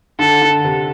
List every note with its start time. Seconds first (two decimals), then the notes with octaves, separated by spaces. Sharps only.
0.19 D3 A4
0.42 D3
0.65 C3